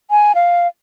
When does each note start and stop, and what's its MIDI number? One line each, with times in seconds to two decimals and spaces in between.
0.11 0.32 80
0.35 0.67 77